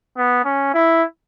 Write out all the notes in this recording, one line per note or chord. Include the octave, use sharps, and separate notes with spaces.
B3
C#4
E4